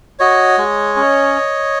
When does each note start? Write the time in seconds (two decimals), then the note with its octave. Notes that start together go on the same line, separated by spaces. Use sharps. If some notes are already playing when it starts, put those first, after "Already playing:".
0.19 F#4 C#5 D#5
0.58 G#3
0.96 C#4